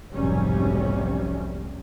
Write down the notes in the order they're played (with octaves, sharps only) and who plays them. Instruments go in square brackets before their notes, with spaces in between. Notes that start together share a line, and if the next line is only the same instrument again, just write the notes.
[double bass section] F1 B1 G#2 C3 G3 C#4